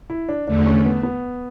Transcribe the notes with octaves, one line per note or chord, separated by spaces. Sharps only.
E4
D4
E2 D3 A3 D4
C#4
B3
B3